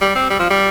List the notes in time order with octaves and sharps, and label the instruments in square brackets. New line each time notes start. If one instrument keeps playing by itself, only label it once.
[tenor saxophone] G3
C4
G3
F3
G3